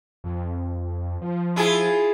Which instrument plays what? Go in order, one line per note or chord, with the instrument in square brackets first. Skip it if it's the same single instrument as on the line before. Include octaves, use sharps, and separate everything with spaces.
[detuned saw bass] F2
F3
[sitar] E4 F4 G#4